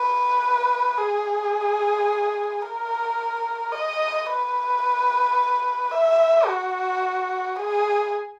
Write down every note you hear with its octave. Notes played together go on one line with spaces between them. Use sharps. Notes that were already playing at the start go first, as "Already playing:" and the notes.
Already playing: B4
G#4
A#4
D#5
B4
E5
F#4
G#4